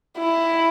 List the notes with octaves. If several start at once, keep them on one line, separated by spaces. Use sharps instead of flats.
E4